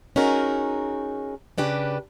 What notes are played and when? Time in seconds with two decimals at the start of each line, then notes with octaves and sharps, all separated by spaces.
0.16 C#4 D#4 F#4 G#4 A#4
1.58 C#3 D4 G4 B4